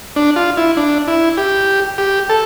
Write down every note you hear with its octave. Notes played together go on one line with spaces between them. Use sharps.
D4
F4
E4
D4
E4
G4
G4
A4